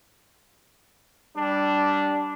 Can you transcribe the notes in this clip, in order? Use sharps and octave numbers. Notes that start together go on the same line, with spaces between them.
G3 D4